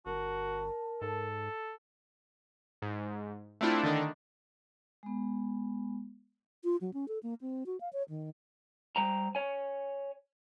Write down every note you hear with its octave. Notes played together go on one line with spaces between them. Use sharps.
G1 F#4 A#4 A5
G#2 A4
G#2
A3 C4 D4 E4 F4
D3 D#3 D4 D#4
G#3 B3
F4
F#3
C#4
A4
A#3
C4
F#4
F5
C#5
D#3
G3 C5 G5 A#5
C#5 G#5